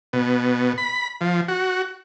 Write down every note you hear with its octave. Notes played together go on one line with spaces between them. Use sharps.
B2
B5
F3
F#4